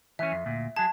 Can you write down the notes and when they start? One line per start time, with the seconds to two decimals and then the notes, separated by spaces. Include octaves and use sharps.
0.19 E3 C#4 E5
0.32 F2
0.46 D2 A#2
0.76 F#3 G#4 A5